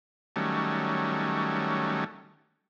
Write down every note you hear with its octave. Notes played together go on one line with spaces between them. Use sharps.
D#3 F#3 G3 A3 C#4